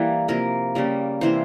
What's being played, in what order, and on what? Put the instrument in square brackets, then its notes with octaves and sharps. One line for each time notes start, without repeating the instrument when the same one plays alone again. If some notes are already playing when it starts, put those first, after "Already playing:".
Already playing: [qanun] E3 G3 A#3
C3 F3 A#3 A#4
C#3 G3 A#3
C3 E3 A#3 C5